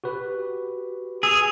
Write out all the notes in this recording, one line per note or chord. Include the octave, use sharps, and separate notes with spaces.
F#4 G4 B4
G#4 E6 F7